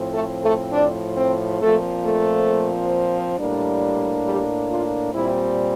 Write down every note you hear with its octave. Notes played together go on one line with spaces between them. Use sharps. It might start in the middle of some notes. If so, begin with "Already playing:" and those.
Already playing: A2 F3 C4
A3 A4
A3 A4
D4 D5
C4 C5
A#2 F3 A3 C4 A4
A3 A4
A2 G3 A#3 D4
G3 G4
F4
A#2 G3 C4 E4